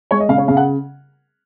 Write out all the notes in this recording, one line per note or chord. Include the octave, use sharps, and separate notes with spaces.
G#3 C#5
D#5
C#3 F5
C#5
C#3 F5
F#5